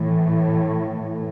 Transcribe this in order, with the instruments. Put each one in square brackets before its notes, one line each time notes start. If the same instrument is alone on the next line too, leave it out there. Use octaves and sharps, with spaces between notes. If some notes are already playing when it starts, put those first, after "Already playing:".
Already playing: [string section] A2 E3